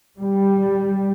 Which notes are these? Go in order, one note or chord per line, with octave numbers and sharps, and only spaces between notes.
G3